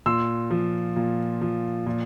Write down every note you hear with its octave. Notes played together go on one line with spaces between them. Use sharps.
A#2 C6 E6
F3
A#2
F3
A#2